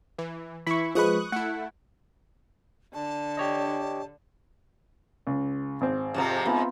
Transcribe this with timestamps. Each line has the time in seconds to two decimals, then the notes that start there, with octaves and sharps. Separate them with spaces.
0.19 E3
0.67 E3 E4 B5 C#6
0.95 F3 G#3 B4 C#6 D#6 F#6
1.32 A3 E4 F#5
2.94 D3 A5
3.37 G4 C#5 D#5
5.27 C#2
5.81 G#1 C4
6.14 F2 C3 F3 E5 A#5
6.46 G#2 B3 C4 F4 B4